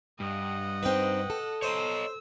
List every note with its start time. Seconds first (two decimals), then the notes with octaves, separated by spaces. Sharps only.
0.20 G2 D#5 F#5
0.83 C4 D#4 B4 G5
1.30 A4
1.62 C5 C#5 D#5 A#5 E6